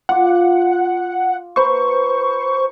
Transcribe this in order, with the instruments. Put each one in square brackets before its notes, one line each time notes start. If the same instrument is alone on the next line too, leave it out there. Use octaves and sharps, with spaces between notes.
[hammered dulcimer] F4 D6 [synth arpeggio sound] F#5
[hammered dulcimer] B4 A#5 C6 [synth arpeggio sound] C5 C#6